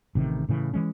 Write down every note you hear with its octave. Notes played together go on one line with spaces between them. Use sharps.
A1 C3 D#3
A2 C#3 E3
E3 G#3 C#4